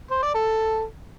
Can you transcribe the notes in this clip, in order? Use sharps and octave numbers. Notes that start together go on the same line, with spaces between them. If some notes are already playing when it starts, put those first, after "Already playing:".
C5
D5
A4